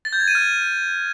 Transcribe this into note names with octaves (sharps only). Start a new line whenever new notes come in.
A6
G6
G#6
D#7
F6